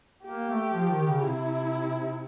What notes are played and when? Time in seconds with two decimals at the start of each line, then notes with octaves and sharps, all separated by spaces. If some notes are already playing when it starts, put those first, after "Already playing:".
0.25 A#3 G4
0.50 A3
0.74 F3
0.90 D#3
1.06 C#3
1.22 C3 E4